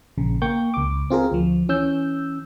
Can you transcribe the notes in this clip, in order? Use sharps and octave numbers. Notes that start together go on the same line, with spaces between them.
A#1 C#3
A#3 G5 C#6 G6
C#2 D6
C4 F4 G#4 A#4
D2 F3
E3 C#4 E6 G6